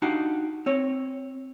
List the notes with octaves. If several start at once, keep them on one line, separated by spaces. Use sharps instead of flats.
D4 D#4 F#4 G4 F5 F#5
C4 C#5